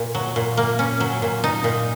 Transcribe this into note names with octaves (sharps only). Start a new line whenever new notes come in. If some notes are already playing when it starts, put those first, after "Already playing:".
Already playing: A#2
F#3
A#2
A#3
C#4
F#3
A#2
D#4
A#2